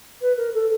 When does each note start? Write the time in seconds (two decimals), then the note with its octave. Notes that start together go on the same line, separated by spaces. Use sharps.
0.21 B4
0.36 A#4
0.54 A4